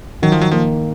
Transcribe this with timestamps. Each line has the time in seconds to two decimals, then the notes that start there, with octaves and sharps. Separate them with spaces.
0.22 D#3 F#3
0.32 F3
0.41 F#3
0.51 F3 A#3